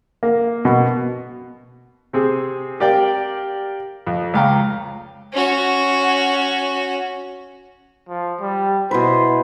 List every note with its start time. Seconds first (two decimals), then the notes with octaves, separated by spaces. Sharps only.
0.23 A#3
0.65 B2
2.13 C3 C4 G#4
2.80 G4 A#4 D5 F5 G5
4.07 F2
4.34 C#2 F5 G5 A#5
5.33 C#4 F#4
8.09 F3
8.41 G3
8.91 B2 E4 B4 C5